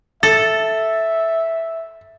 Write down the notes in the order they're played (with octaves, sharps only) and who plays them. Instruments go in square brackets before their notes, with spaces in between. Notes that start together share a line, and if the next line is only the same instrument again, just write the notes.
[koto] A4 [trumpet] E5 [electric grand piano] A6